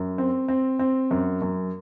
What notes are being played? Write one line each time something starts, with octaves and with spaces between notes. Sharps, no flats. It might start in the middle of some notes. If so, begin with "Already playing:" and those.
Already playing: F#2
C4
C4
C4
F#2
F#2